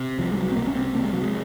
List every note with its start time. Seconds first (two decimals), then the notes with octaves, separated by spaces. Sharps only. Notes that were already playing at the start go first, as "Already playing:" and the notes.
Already playing: C3
0.19 C2 F3
0.31 G#3
0.37 F#3
0.52 C4
0.56 C3 A#3
0.67 C#4
0.75 C4
0.95 C3 A#3
1.05 G#3
1.13 F#3
1.23 G#3